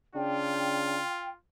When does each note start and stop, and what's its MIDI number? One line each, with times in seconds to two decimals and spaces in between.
0.15 1.02 49
0.15 1.01 62
0.15 1.37 65
0.15 1.30 79